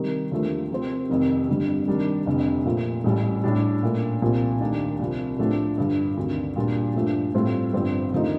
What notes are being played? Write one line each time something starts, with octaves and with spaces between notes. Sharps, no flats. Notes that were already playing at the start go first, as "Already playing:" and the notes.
Already playing: C3 D#3 G3
D#2 D3 F3 A3
C3 F3 C4
F1 F2 D#3
G1 F2 D3 G3
C3 D#3 G3 D4
F1 F2 D3
A#2 F3 A3
A1 A2 G3
A2 G3 D4 G4
A#2 A3 D4
C2 A#2 F3
D#2 D#3 A3 D4
C2 C3 F3
A2 F3 A3 D4 G4
G2 D3 F3
D2 C3 D#3
A#2 G3 A#3 D4 F4
G2 F3 A3 D4
A2 G3 C4 F4 A4
G1 G2 F3 C4
D#2 D3 F3 A3 D#4